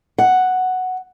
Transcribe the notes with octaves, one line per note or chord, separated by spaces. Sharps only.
F#5